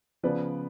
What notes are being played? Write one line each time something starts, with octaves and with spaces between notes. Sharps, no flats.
C#3 F3 B3 B4 D5